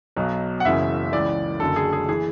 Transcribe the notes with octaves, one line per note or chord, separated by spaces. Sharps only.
B1 B2 F#3
F#5
F#1 F#2 C#3 E3 E5
C#2 C#3 E3 D5
F#1 F#2 D3 F#3 A4
G#4
G#4
E3 G#4